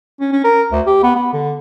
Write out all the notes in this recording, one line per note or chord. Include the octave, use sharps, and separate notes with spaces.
C#4
C#4
A#4
D2
G4
B3
B3
D3